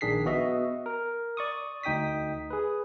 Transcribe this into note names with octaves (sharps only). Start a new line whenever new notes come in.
A#1 D#3 D4 G#4 B6 C7
B3 F#4 D#5 E5
A#4
D5 C#6 D#6
D2 D#4 G5 D#6 B6
G#4 B4